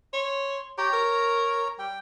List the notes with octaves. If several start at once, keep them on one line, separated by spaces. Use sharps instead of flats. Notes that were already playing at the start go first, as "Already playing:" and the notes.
C#5 C6
G4 C#5 A#5
A#4
G3 G5